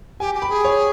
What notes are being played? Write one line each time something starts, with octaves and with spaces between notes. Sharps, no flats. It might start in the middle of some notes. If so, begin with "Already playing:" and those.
G4 G#5
G4
B5
G#4
C#5